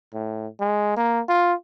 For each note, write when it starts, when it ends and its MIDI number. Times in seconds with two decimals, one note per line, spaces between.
0.14 0.47 45
0.60 0.94 56
0.97 1.20 58
1.29 1.53 65